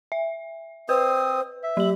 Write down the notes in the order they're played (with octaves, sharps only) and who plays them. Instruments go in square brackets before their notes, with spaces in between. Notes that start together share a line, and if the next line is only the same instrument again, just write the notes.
[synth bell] E5
[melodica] C4 D#6 [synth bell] B4 [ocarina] C5
[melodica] E5
[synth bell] F#3 F#7 [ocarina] G4